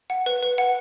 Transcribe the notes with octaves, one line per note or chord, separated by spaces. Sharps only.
F#5
B4
B4
F#5